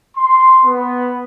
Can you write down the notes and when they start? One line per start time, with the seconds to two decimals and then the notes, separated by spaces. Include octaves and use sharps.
0.17 C6
0.65 B3